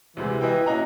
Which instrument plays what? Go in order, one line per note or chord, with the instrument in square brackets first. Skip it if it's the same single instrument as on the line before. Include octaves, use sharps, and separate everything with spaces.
[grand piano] D2 C3 G#3 [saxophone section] E3
[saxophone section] E3 [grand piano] D#5 G5
[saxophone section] A#3 F#4 [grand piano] C#4 D#5 A#5